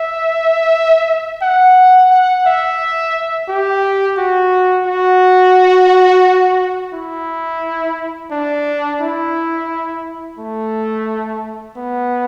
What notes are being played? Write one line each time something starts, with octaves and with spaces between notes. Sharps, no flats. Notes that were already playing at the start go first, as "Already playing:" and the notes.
Already playing: E5
F#5
F#5
E5
G4
F#4
F#4
E4
D4
E4
A3
B3